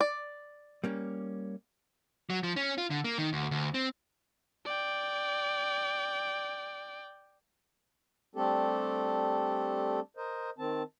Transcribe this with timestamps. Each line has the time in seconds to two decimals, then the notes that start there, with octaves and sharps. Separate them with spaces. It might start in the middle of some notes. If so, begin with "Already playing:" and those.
0.01 D5
0.84 G3 A#3 C#4
2.30 F#3
2.43 F3
2.56 C#4
2.78 F4
2.90 D3
3.04 A#3
3.18 D#3
3.33 D2
3.51 D2
3.74 C4
4.66 D5 G5
8.36 G3 A3 C4 D4 G4 A4
10.17 A#4 C5 D#5
10.58 D#3 C4 A5